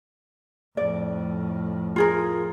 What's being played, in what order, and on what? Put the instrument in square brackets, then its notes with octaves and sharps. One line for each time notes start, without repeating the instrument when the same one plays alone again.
[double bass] F2 A2 [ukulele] D5
[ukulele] F4 G#4 A#4